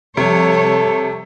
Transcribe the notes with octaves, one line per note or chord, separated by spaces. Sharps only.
C3 F3 G3 A4 C#5